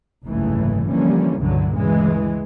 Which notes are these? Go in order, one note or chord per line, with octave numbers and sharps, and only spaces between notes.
F#1 C2 G#2 C#3 E3 A3
D3 E3 F3 G3 A#3 C#4
C#2 G2 A#2 D3 E3 F#3
D2 C#3 E3 G#3